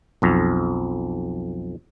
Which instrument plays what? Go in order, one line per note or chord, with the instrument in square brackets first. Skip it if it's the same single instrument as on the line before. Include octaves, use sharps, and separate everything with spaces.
[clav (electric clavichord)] B1 F2